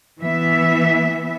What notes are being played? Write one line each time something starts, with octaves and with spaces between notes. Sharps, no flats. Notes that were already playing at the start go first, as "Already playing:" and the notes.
E3 B3 E5